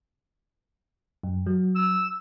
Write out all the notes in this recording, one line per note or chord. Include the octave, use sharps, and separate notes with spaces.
F#2
F#3
E6